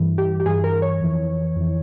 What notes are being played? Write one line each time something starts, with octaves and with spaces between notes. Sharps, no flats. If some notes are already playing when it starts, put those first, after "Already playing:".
Already playing: G2 E3
G4
G4
G2 E3 G#4
A#4
C#5
F2 E3
F2 E3